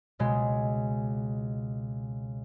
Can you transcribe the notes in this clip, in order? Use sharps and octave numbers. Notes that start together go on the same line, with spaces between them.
C#2 B2 G#3